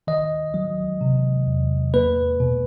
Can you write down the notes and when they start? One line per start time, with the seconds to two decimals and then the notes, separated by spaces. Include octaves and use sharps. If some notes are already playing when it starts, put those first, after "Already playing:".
0.07 D#3 D#5
0.54 F#3
1.01 C3
1.47 E2
1.94 A#3 B4
2.40 B2